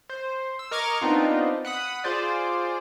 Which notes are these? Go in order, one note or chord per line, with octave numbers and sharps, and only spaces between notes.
C5
E6
A#4 D#5 C#6 D6 F6 G#6
B3 C4 D4 D#4 F4
F#5 B5 D#6
F4 G#4 C5 D5